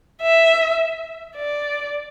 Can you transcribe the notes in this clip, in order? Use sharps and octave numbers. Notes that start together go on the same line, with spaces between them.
E5
D5